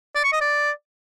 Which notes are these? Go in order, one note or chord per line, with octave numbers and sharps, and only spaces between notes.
D5
C#6
D#5
D5